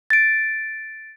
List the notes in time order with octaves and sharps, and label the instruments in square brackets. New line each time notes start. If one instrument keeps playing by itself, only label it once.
[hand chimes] A6 D7